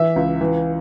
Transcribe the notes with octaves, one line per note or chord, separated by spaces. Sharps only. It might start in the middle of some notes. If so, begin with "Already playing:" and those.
Already playing: E3 E5
C#2
E3